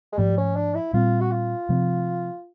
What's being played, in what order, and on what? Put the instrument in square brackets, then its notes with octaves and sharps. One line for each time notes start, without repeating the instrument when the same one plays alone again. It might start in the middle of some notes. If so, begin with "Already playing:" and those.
[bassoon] G#3
[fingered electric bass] G#2 F3 A3 [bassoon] G3
[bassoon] C#4
D4
E4
[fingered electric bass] A#2 G3 C4 [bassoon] F4
[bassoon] F#4
F4
[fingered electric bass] C3 F3 A3 C4